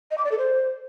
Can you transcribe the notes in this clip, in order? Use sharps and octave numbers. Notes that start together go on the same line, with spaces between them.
D#5
D6
D5
A4
C5